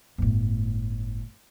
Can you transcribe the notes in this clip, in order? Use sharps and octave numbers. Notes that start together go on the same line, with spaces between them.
G1 A2